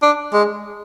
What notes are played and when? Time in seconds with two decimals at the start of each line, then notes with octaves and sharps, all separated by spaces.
0.02 D4
0.33 G#3